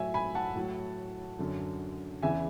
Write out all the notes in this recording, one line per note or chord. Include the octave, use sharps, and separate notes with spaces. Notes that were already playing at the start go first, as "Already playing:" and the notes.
Already playing: A2 F#3 E5 G#5
G#5 B5
F#5 A5
A2 F#3
F#2 D3 F#3
E2 C#3 E3 E5 G#5